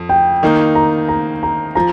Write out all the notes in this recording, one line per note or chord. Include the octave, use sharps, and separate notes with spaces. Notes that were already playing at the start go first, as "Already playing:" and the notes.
Already playing: F2
G5
D#3 A#3 D#4
A#5
A#5
A#5
F3 A#5